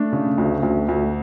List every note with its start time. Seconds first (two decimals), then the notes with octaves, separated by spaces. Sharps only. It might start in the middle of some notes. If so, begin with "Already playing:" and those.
Already playing: A3 D4
0.12 C#3
0.38 D2
0.63 D2
0.88 D2